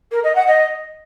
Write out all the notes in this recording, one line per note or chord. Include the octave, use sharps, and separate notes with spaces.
A#4
D#5
F#5
D#5